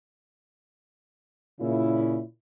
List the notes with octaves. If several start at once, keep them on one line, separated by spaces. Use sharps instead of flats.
A#2 C#3 E4